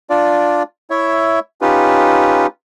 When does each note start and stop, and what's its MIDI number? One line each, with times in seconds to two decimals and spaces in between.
0.10 0.63 62
0.10 0.63 65
0.10 0.63 74
0.90 1.39 64
0.90 1.39 73
0.90 1.39 76
1.61 2.47 61
1.61 2.47 63
1.61 2.47 65
1.61 2.47 67
1.61 2.47 71